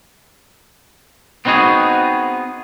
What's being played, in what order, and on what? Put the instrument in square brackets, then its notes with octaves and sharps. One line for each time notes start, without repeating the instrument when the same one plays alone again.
[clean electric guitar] B3 C4 D#4 F#4 G#4